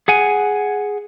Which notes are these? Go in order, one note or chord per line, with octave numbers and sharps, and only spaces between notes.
G#4 F#5 G#5